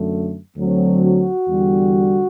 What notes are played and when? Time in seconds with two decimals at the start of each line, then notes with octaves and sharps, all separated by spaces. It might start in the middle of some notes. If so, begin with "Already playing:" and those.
Already playing: F#2 D3 A3
0.56 D2 D3 F#3 C4
1.02 F#4
1.48 E2 D3 G3